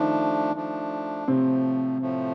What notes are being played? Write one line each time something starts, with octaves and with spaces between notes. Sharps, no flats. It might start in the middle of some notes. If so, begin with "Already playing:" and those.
Already playing: D#3 F3 A3 D4 D#4
F3 A3 D4
A2 C3 F3 A3 C4
A2 F3 A3